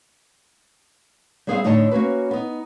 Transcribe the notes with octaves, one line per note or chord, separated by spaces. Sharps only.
G3 B3 G#4 C5 E5 F5
A2 D3 D#4 C#5 D#5 A5
A#3 C#4 F#4 B4
B3 D#4